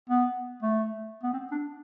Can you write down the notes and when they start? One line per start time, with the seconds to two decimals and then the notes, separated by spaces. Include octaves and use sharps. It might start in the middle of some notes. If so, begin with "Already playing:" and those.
0.10 B3
0.63 A3
1.23 B3
1.33 C4
1.52 D4